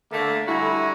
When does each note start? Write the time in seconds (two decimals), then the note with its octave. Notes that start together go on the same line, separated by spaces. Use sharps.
0.11 D3 A3 A#3
0.47 D3 G3 E4 F#4 G#5 A#5